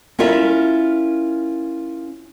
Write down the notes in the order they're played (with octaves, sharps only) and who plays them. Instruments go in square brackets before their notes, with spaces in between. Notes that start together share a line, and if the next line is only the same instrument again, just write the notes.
[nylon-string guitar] C#4 E4 F4 A#4 E5